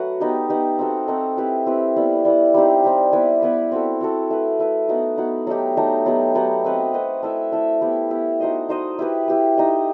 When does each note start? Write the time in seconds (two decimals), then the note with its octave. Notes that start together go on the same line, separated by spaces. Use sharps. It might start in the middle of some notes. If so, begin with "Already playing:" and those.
Already playing: F#3 A3 F#4 B4
0.20 B3 D#4 G4
0.49 B3 D#4 G4
0.79 C4 D#4 F#4 A4
1.08 C4 D#4 F#4 A4
1.37 C4 E4 G4 B4
1.66 C4 E4 G4 B4
1.96 G3 B3 E4
2.25 G3 B3 E4
2.54 G3 C4 D#4 G4
2.84 G3 C4 D#4 G4
3.13 B3 E4 B4
3.42 B3 E4 B4
3.72 C4 F#4 A4
4.01 C4 F#4 A4
4.30 A3 E4 B4
4.59 A3 E4 B4
4.89 B3 D#4 F#4
5.18 B3 D#4 F#4
5.47 F#3 A3 D#4 G4
5.76 F#3 A3 D#4 G4
6.06 F#3 B3 D#4 G4
6.35 F#3 B3 D#4 G4
6.65 C4 F#4 B4 D#5
6.93 C4 F#4 B4 D#5
7.23 A3 E4 A4 E5
7.52 A3 E4 A4 E5
7.81 B3 E4 G4
8.11 B3 E4 G4
8.40 D#4 F#4 C5 D#5
8.69 D#4 F#4 C5 D#5
8.99 E4 G4 B4
9.28 E4 G4 B4
9.57 D#4 G4 D#5